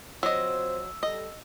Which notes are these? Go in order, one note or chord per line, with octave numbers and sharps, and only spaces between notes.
F#3 C4 F4 C5 D#5 E6
G3 A4 D#5